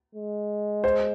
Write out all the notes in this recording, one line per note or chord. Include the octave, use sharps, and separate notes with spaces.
G#3
C5